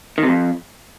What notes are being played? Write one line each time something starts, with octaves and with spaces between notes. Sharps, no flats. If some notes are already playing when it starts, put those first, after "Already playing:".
D#3
C3
F2